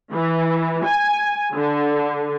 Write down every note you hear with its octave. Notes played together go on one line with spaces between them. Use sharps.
E3
G#5
D3